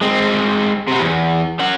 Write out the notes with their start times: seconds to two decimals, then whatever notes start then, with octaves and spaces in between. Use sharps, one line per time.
0.01 G#3 C4
0.88 C3 B3
1.00 E2
1.60 C#4 F#5